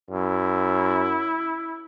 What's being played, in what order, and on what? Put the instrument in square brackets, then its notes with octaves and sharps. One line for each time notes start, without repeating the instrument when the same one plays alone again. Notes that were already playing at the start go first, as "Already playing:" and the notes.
[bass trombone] F#2 [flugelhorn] E4